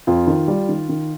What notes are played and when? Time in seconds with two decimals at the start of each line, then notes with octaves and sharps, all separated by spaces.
0.07 F2 F4
0.27 D#3
0.48 G3
0.69 D#3
0.89 D#3